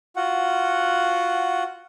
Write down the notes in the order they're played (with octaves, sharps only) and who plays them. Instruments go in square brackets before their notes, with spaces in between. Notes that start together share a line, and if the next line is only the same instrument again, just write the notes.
[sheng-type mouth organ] F4 F#4 F#5